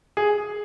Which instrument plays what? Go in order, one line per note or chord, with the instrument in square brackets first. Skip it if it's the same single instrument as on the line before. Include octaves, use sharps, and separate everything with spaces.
[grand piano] G#4